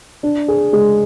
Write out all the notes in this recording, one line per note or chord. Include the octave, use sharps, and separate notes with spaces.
D4
G#4
G#3